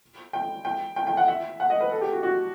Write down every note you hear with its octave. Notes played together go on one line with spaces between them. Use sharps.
G5
G5
G5
G5
F#5
E5
F#5
D#5
B4
A4
G4
F#4
F#4